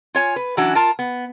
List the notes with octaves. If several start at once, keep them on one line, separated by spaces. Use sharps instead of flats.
F4 C#5 G#5
B4
E3 F#3 C#4 D4 F#4
F4 A#4 A5
B3